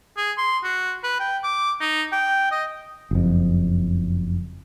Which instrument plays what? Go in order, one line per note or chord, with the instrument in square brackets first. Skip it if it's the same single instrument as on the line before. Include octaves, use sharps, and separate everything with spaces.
[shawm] G#4
C6
F#4
B4
G5
D6
D#4
G5
D#5
[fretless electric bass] F#1 F2